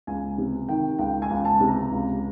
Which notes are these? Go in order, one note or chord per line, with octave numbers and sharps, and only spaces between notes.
C#2 G#5
C3
D#3 G5
C#2 G5
G#5
C#2
A5
C3
A#5
C#2